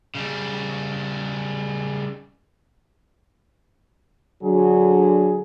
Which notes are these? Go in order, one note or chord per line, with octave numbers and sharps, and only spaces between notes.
C#3 G3
D3 F#3 G#4